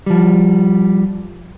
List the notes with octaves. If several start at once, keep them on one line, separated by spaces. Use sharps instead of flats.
F3 G3